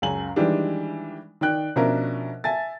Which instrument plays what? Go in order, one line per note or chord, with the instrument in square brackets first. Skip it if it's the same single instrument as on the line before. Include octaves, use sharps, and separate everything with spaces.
[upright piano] C#2 F#2 G#5 F#7
D#3 E3 G3 G#3 D4
D#3 D5 G5 F#6
B2 F3 C#4 D4 A#4 E5
E5 G#5 A5 A6